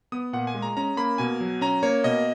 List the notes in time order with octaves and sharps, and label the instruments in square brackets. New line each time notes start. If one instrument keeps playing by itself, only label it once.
[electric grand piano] B3 D#6
A#2 F#5
G#5
G#3
A#5
C#4 A#5
A#3 B5
B2 G#5
F#3
C#4 A#5
A#3 C#5
B2 D#5